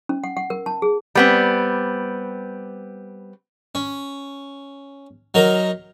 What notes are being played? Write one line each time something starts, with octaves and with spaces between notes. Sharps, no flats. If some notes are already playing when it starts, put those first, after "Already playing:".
C#4
F#5
F#5
A#4
A5
G#4
G3 B3 C4
C#4
F#3 D#4 A#4